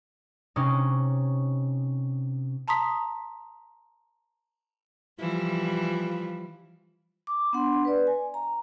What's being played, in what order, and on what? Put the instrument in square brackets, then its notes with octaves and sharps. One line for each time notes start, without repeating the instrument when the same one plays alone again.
[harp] C3 C#4 D#4
[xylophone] A5 A#5 C6 D#6 B6
[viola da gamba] E3 F3 G3
[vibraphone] D6
B3 D4 F#5 C6
B4 D5
G#5
A#5